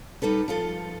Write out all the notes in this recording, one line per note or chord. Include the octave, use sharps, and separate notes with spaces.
G3 D#4 A4 B4
F3 F4 A4